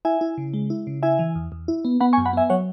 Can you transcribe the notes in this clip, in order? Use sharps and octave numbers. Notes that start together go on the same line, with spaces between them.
E4 E5 G#5
E4
C#3
G#3
E4
C#3
E4 E5 G#5
E3
E2
E2
E4
B3
B3 F#5 B5
G#5 C#6
F#2
F#5 B5
B3 E5 G#5
F#3 C#5 F#5